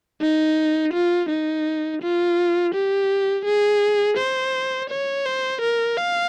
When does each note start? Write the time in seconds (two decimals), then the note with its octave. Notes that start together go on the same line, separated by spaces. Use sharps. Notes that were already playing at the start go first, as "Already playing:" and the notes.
0.21 D#4
0.93 F4
1.29 D#4
2.01 F4
2.74 G4
3.45 G#4
4.17 C5
4.90 C#5
5.25 C5
5.61 A#4
5.97 F5